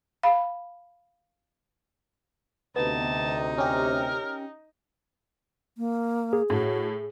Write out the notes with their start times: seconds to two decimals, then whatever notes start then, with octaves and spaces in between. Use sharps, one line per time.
0.23 F5 B5
2.76 D2 C3 B3 D#4 A5
3.58 C#4 G4 A#4
5.78 A#3
6.33 G#4
6.50 A2 F#4